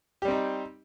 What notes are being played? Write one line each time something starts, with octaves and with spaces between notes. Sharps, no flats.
G3 C4 D#4 G4